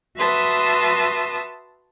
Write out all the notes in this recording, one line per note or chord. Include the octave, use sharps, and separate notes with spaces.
F#4 B4 E5 A5 C6 D#6